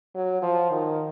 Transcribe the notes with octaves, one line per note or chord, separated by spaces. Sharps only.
F#3
F3
D#3